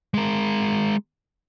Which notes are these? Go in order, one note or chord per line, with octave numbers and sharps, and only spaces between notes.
G#3 A#4